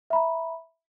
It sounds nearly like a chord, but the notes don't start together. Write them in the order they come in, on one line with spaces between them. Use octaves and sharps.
E5 B5 A#5